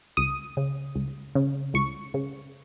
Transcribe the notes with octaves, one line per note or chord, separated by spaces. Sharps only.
C#2 D#6
C#3
C#2
C#3
C#2 C#6
C#3